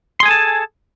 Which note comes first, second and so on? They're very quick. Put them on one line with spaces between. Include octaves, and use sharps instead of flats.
C6 G#4 G#5 A4 A5